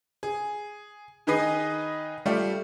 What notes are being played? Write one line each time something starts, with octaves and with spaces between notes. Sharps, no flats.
G#4
D#3 D#4 G#4 B4 D#5 C7
G3 A3 F4 G4 D5